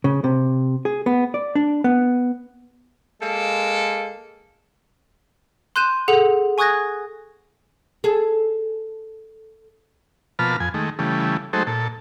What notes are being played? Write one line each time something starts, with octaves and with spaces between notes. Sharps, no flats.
C#3
C3
G#4
B3
D5
D4
B3
G#3 A#3 A4
C6 F#6 G6 D#7 E7
G#4 A4 F#5 F7
G#5 C#6 D#6 F#6 G#6 A#6
G#4 A4
B2 F3 A#3 A5 B5 F6
F2 G#5
D#3 G#3 A3
C#3 E3 G3 A3
F#3 G#3 A3 D#4 A4 C5
A#2 A4